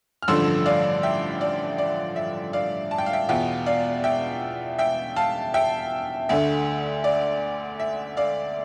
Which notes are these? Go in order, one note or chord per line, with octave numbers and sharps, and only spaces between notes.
F6
A1 G2 D3 F3 A3 C6 E6
D5 F5
E5 G5
D5
D5
E5
D5 F5
A5
G5
F5
E5 G5
E2 B2 B3 F4 E5 G5
D5 F5
E5 G5
E5 G5
F5 A5
E5 G5
D2 D3 A3 E5
D5
E5
D5 F5